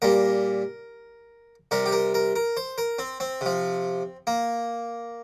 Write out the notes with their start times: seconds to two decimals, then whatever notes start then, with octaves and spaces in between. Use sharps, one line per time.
0.02 A#2 G3 A#4
1.71 C3 G3 A#4
1.86 G4
1.92 A#4
2.14 A#4
2.36 A#4
2.57 C5
2.78 A#4
2.99 C4
3.20 C4
3.41 C3 F3
4.27 A#3